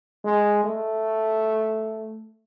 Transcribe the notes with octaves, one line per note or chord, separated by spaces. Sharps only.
G#3
A3